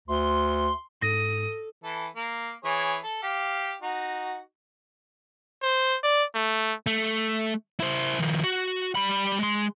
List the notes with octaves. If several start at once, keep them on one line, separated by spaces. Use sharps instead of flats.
D2 C6
G#2 A4 D#6 A#6
E3 A4
A#3
E3 G#4 C#5
A4
G4 F5
D#4 F#4
C5
D5
A3
A3
E4 C5
D#3 F3
F#4
G3 B5
G#3 C6